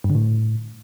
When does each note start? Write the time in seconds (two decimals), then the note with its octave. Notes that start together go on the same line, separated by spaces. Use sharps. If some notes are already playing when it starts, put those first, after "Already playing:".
0.04 G2
0.10 D3
0.15 A2